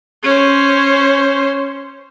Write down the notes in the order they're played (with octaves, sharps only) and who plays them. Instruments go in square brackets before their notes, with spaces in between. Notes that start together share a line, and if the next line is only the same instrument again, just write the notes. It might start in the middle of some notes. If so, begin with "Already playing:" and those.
[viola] C#4 C5